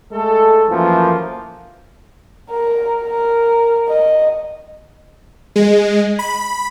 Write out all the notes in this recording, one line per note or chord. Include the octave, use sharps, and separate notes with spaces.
G#3 A3 A4
F#2 E3 F3 A3 A#3
A#4
A#4
D#5
G#3
B5